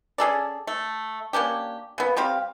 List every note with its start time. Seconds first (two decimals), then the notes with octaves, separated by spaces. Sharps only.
0.18 C#4 G#4 A4 D5
0.67 A3
1.33 A#3 C#4 D4 G4
1.98 C#3 B3
2.17 G3 C4 G4 F5